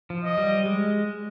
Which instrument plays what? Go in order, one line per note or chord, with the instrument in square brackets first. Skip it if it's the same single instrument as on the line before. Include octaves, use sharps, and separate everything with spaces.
[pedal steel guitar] F3
[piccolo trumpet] D#5
[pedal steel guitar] G3
G#3